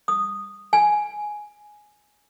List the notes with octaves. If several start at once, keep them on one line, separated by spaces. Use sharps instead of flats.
D#6
G#5